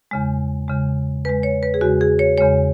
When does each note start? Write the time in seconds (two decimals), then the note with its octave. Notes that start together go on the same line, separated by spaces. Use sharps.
0.11 E2 C#3 G#3
0.68 E2 C#3 G#3
1.25 E2 C#3 G#3 B4
1.43 C#5
1.63 B4
1.74 G#4
1.81 E2 C#3 G#3 F#4
2.01 G#4
2.19 C#5
2.38 E2 C#3 G#3 C#5